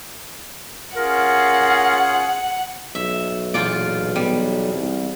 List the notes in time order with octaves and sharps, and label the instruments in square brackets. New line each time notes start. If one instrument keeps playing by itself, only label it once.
[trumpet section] C#4 F4 G#4 [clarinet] A#4 [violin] F#5
[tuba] B1 [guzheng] E5
[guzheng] E2 F4 D5 [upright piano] A#2
[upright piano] B2 B3 [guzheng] G3
[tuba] C2